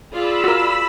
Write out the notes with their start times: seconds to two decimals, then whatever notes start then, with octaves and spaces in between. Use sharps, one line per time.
0.12 F4 G#4 D5 B5 E6
0.44 F#4 A#4